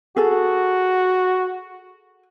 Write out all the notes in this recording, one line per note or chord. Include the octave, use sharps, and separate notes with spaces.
F#4 G#4 A4